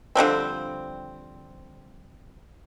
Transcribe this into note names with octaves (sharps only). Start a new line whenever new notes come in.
D3 F3 G3 C4